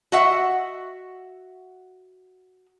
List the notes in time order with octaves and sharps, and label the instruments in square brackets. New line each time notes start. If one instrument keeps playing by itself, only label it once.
[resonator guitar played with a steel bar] F#4 D#5 E5 F#5